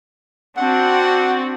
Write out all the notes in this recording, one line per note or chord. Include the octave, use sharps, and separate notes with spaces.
C4 D4 F#4 F#5